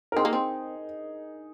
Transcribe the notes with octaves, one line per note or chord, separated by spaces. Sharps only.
A#4
C4 D#4 G#4
A#3
C4